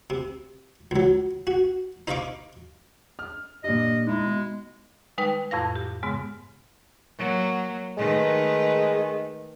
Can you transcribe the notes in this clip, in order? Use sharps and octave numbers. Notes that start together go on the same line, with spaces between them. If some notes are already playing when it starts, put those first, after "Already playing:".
C3
C#2 F#3
F#4
D#4 C5 D#5 F5 C#6 D6
F6
G2 A#2 D#5
G#3 D#4 E4
B2
D#3 G3 G#3 D#4 B4 G5
F2 A2 E4 F5 A#6
G4
G#2 C#3 G#3 B3
F#3 A#3
D#3 G#3 A3 B4